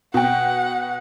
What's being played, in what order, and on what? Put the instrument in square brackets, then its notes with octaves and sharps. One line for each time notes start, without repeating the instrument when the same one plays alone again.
[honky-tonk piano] B2 G5 [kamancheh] F#5